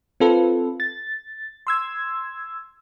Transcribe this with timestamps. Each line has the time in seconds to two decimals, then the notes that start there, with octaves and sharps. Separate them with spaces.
0.20 C4 F4 A4 B4
0.80 A6
1.67 C6 E6 G#6